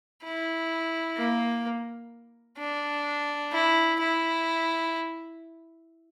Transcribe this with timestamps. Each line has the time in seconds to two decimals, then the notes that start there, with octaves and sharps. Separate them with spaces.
0.24 E4
1.17 A#3
2.59 D4
3.52 E4
4.00 E4